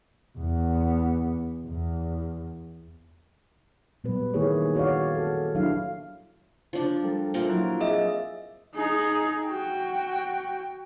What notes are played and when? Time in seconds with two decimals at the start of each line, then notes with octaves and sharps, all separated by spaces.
0.38 E2 B3
1.67 E2
4.04 A#2 F#3 G3 B3 B4
4.34 D#3 A#3 E4 G4 G#4 C#5
4.75 F#4 C#5 D5 F5
5.15 F#4 A4
5.55 F#3 D4 E4 F5
6.73 F3 D4
7.03 G3 A4 A#4
7.34 A#2 F3 F4 A#4 E5
7.50 F#3 E4
7.81 C4 G#4 D#5 E5
8.74 D#4 G#4
9.46 F#4 G5